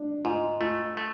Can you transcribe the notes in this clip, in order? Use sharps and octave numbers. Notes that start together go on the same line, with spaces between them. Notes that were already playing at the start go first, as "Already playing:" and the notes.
Already playing: D4
G#2 F4
A3 F4
A3